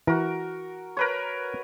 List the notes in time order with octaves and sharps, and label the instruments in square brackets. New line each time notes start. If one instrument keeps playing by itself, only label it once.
[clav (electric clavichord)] E3 [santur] F#4 A#4
[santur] A#4 B4 C#5